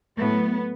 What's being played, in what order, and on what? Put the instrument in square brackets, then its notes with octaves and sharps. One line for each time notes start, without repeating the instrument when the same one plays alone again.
[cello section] A2 F#3 A3 B3